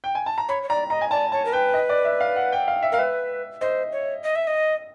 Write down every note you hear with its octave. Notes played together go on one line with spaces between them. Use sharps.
G5
G#5
A5
A#5
C#5 B5
C#5
D5 A#5
D#5 A#5
G#5
D5 A5
C#5 A5
A#4
B4 G5
D#5
D5
E5
F5
F#5
G5
F5
E5
A#4 F5
B4 E5
C5 D#5
C#5
D#5
E5
D#5